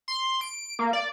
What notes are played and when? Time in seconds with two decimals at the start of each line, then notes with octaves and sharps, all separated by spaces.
0.08 C6
0.41 D7
0.79 A#3
0.93 D5